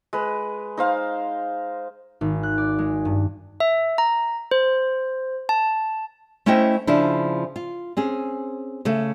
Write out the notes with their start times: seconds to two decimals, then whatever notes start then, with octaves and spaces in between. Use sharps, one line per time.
0.13 G#3 B4
0.77 D#4 C5 F5
2.21 G#1
2.43 F#6
2.58 D5
2.79 G#3
3.05 G2
3.60 E5
3.98 A#5
4.51 C5
5.49 A5
6.46 A3 C#4 E4 C5 D#5 G5
6.87 C#3 F3 D4 E4
7.56 F4
7.97 C4 C#4 G#4
8.85 C#3 A3